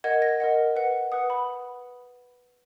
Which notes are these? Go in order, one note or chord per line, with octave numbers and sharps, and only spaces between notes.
A#4 D#5 F#5 G#6
A#6
A#4 D#5 F#5
B4 F#5
B4 F#5 D#6
B5